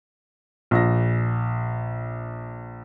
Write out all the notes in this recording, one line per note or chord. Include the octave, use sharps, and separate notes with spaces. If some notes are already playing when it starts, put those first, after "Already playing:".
A#1 A#6